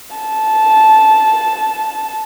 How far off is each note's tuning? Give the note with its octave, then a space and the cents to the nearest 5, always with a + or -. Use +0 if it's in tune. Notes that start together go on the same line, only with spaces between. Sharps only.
A5 -10